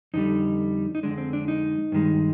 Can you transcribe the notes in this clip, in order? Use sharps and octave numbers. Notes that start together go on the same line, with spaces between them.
F2 D3 G3 D#4
D#4
F2 D3 G#3 D4
C4
D4
D#4
G2 D#3 G#3